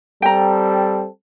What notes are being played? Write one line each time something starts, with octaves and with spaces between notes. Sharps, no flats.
G3 C4 A4 G5 A#5